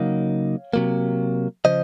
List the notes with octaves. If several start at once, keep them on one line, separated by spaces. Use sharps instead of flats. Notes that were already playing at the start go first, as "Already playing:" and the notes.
Already playing: C#3 F#3 A#3 D#4 C#5 F5
C3 F#3 A#3
C#3 F3 C5 D#5